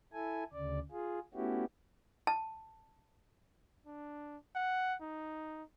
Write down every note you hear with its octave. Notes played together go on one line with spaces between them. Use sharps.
E4 A4 G#5
D2 C#3 D5
F4 G#4
A3 B3 C#4 E4 F#4 G4
A5
D4
F#5
D#4